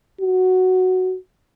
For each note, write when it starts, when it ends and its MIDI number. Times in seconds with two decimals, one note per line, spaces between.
0.21 1.16 66